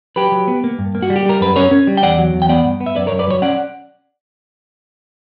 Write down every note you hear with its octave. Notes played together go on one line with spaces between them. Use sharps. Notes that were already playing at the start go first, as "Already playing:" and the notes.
F#3 G4 B4
F#3
B3
A#3
G2
A#3
F#4
G3
G4
G3 A#4
F#2 B4
C#4 A#4 C#5
C#4
G3
G5
E2 D5 F#5
F#3
E2
G5
B3 D5 F#5
G2
B3
E5
F#2 B4 D5
A#4 C#5
F#2
B4 D5
F#3 C#5 E5
C#4 D5 F#5